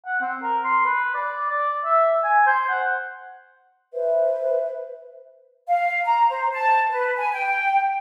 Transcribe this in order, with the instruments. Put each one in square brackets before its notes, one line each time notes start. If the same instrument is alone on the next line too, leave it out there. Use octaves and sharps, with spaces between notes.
[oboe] F#5
C4
A#4
C6
B4
D5
D5
E5
G#5
C5
F#5
[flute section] B4 C5 E5
F5
A#5
C5
A5
B4
G#5
G5